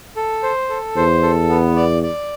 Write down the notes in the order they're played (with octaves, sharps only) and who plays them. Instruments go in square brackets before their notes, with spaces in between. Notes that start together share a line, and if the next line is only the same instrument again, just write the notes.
[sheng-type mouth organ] A4
C5
A4
[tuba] E2 [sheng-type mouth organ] C5
[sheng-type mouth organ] A4
B3
D5
D5